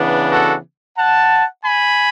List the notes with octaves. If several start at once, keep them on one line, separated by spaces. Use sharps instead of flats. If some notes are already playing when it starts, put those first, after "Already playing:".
Already playing: C#3 E3 B3 D4
F#4 A4
F#5 A5
G#5 B5